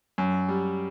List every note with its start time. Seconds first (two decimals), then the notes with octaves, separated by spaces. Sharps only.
0.18 F#2
0.49 G3